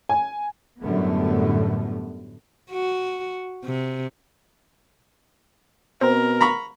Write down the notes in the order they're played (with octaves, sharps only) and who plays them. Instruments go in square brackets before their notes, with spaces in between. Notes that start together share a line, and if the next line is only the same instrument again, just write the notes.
[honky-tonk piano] G#5
[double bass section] F#2 A2 D3 G3 A3 B3
[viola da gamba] F#4
C3
[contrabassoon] B2 [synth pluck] C4 [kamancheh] A#4
[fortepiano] A#5 B5 C#6